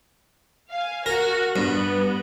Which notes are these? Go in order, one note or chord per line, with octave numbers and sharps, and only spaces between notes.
F5 G#5
F#4 A#4
G2 B3